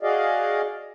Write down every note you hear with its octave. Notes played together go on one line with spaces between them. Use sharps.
F#4 G#4 D5 D#5 F5